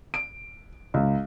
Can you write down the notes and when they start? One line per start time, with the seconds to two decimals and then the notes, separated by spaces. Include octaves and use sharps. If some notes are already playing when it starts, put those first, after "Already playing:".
0.14 D7
0.94 C#2